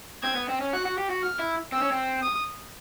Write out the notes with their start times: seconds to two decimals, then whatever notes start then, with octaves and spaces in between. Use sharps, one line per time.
0.23 C4 G#6
0.36 B3
0.49 C4
0.61 C#4
0.73 F#4 F#6
0.85 F#4
0.98 G4
1.10 F#4
1.23 F6
1.39 E4
1.72 C4 E6
1.82 C#4
1.92 C4
2.23 D#6